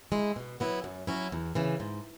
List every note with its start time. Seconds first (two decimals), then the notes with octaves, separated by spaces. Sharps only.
0.12 G#3 E4
0.36 B2
0.60 F#3 B3 E4
0.84 F#2
1.07 F#3 C#4 E4
1.32 E2
1.55 C#3 E3
1.80 G#2